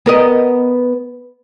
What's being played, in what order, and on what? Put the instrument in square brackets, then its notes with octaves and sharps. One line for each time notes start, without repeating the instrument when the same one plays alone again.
[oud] B3 A#4 D#5